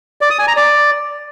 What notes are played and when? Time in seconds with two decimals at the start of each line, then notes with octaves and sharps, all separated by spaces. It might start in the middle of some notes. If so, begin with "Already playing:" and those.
0.21 D5
0.30 D#6
0.39 G#5
0.48 A#5
0.56 D5